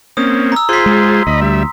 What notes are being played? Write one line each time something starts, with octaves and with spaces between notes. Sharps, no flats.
A#3 C4 C#4 D#6
A#5 E6
F4 G#4 C5 C6 B6
G#3
D2 D#5 B5
G3 E5